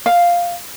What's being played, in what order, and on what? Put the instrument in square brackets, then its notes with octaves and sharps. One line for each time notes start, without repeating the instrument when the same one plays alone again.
[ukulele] F5